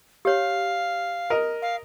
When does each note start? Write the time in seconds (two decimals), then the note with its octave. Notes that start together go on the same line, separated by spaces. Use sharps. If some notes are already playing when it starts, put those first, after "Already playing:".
0.25 G4 C#5 F5
1.30 A#4 D#5
1.62 F5